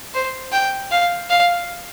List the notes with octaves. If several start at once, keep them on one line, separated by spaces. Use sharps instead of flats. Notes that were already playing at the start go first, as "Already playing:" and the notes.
C5
G5
F5
F5